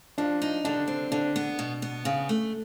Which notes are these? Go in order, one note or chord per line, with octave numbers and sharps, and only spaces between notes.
F3 D4
D#4
D3 D4
C4
D3 D4
B3
B2
B3
C#3
A3